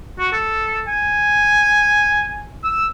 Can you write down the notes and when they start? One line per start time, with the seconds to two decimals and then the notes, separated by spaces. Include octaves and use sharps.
0.19 F#4
0.32 A4
0.88 G#5
2.64 E6